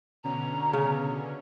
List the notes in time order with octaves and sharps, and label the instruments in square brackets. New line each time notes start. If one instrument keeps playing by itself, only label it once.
[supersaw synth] B2 D3 C#4 [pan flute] A#5
[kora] C#3